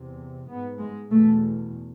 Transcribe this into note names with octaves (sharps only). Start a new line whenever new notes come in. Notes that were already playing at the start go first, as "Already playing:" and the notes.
Already playing: E2 C3
G#2 B3
G#3
E2 B2 A3